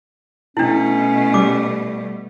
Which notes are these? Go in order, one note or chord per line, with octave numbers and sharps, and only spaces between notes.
B2 A3 C#4 D4 E4
G3 D6